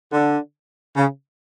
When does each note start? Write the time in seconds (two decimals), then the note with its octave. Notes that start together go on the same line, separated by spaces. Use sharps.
0.12 D3
0.96 C#3